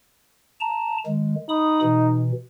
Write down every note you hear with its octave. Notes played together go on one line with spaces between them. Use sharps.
A5 A#5
D#3 G#3
D#4 B5 D#6
B2 E3